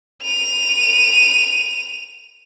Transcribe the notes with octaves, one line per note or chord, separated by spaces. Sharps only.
D#7 F7